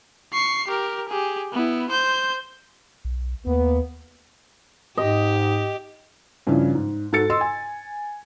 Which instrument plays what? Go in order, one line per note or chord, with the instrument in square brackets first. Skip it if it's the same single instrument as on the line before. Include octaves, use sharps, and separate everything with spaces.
[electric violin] C#6 C7
G4 A#4
G4 G#4
B3 E4
C5 G6
[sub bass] B1
[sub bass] D#2 [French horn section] A#3 B3
[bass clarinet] G#2 [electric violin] G4 [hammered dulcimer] D#5
[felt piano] G2 C#3 F3 C#4 E4
G#2
G#2 F#4 A4 A6 C#7
D#5 C6 E6
G#5